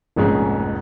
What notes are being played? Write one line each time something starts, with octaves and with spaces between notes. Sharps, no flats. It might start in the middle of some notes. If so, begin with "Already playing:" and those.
F1 A#1 F2 G#2 C#4 G#4